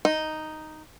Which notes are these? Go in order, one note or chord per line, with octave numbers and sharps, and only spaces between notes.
D#4